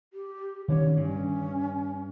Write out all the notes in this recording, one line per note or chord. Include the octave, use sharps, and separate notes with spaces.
G4
D#3 E3 C#4 C#5
G2 C#4